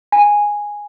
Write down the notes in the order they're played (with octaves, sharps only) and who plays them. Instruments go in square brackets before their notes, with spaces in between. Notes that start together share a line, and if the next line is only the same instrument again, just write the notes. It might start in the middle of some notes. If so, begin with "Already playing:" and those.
[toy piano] G#5